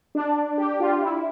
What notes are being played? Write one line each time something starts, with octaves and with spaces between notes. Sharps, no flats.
D4
G4
F4
E4